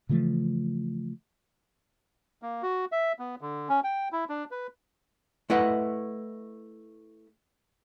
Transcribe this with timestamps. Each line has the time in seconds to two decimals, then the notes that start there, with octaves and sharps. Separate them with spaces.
0.09 C#3 E3 F3 A3
2.42 A#3
2.63 F#4
2.92 E5
3.19 B3
3.41 D3
3.69 C#4
3.84 G5
4.12 E4
4.29 D4
4.51 B4
5.50 A3 E4 B4 D#5 F#5